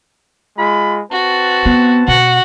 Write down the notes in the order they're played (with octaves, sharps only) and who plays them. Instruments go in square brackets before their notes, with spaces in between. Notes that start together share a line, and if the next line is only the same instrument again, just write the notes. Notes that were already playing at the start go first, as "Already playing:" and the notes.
[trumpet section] G#3 F4 B5
[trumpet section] C4 B4 A5 [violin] F#4
[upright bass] B3
[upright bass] B2 [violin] F#4 F#5